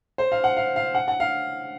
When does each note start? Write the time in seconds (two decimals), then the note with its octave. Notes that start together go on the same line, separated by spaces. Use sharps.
0.18 C5
0.32 F5
0.44 F#5
0.57 F5
0.76 F5
0.95 F#5
1.08 F#5
1.20 F5